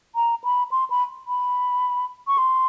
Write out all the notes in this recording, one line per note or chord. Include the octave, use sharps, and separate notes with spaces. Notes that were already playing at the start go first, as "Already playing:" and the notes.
A#5
B5
C6
B5
B5
C#6
C6